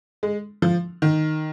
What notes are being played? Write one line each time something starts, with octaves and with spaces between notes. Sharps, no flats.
G#3
F3
D#3